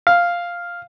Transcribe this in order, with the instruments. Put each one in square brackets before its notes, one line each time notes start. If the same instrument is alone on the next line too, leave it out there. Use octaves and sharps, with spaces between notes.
[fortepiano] F5